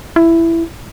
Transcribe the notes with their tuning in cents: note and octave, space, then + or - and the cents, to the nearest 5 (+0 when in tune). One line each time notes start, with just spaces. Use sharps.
E4 +10